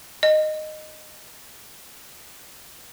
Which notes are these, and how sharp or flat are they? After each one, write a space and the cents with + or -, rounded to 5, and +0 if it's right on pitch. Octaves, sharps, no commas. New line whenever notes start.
D#5 -10